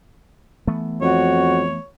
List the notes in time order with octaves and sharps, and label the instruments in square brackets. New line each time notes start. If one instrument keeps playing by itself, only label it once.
[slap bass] E3 A3 B3
[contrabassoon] F2 [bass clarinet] F#4 [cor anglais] C#5